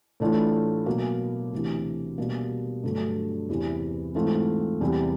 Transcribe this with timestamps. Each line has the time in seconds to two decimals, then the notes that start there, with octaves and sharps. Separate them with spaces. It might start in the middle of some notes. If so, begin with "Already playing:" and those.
0.20 A2 E3 A3 D4 F4
0.86 B2 F#3 A#3
1.53 D2 C3 E3
2.18 B2 G3 A#3
2.83 G2 D3 F#3 A3 D4
3.49 E2 C3 E3
4.15 G#2 E3 A3 C4 F4
4.81 E2 C3 E3 G3